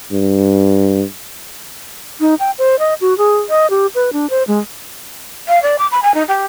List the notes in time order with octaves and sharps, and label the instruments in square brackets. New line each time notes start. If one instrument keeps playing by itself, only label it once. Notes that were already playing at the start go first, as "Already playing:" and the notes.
[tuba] G2
[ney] D#4
G5
C5
D#5
F#4
G#4
D#5
G4
B4
D4
C5
G#3
[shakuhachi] F5
D5
D6
B5
G#5
D#4
G4